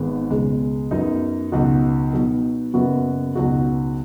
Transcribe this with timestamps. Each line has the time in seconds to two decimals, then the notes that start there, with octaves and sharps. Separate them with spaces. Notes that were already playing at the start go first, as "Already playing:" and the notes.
Already playing: G#1 G#2 D#3 G#3 B3
0.30 C#2 B2 G#3
0.91 F#2 F#3 B3 D#4
1.52 C#2 B2 F#3 D#4 F#4
2.13 B2 F#3 D#4
2.74 F#1 F#2 F#3 B3 F#4
3.35 C#2 B2 F#3 D#4 F#4